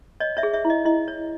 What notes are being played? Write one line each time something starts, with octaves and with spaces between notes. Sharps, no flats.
C#5 D#5
C#5 E5
G#4
C#5 E5
E4
D#5
E4 D#5
C#5